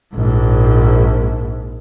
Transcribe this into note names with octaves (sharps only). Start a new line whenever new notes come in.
A#1 G#2